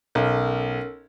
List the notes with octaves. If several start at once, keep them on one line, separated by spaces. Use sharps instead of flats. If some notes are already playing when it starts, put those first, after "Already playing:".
B1 C#4 A4 A#4